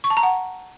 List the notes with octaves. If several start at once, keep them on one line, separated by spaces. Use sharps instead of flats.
C#6
A5
A#5
F#5